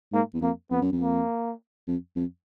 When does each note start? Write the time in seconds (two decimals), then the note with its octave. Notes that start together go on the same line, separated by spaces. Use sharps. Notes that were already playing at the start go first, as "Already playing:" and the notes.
0.13 G#2 A#3
0.34 E2
0.42 F2 A#3
0.71 F2 B3
0.81 F#2
0.92 F2
1.01 A#3
1.88 F2
2.16 F2